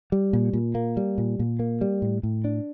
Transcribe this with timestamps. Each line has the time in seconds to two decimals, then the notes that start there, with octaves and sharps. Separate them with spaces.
0.12 G3
0.33 A#2
0.53 A#2
0.75 A#3
0.97 G3
1.18 A#2
1.39 A#2
1.59 A#3
1.81 G3
2.02 A2
2.23 A2
2.44 D4